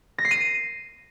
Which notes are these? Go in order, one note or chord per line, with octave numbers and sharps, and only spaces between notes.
A#6
C7
D#7